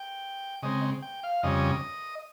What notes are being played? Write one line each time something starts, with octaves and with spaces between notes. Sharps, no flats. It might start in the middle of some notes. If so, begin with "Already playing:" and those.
Already playing: G5
C#3 G#3 C4 D#5
G5
F5
F2 C#3 G3 C#4 D#5